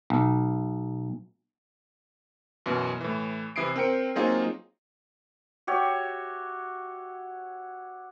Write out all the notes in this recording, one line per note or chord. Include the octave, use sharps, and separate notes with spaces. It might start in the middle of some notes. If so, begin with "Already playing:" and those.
B1
F#2 B2 E3
A2 E3
C3 E3 E4 D#6 C7 D7
C4 A#4 G5 C#7 D7
F#3 A#3 C4 D#4 F4 G#4
F#4 G4 C#5 E5